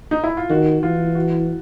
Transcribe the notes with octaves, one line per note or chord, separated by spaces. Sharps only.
D#4
E4
F4
D#3 F#4
E3 F4
F#4